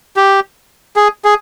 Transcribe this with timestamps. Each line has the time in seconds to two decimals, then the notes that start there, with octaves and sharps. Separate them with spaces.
0.16 G4
0.96 G#4
1.25 G#4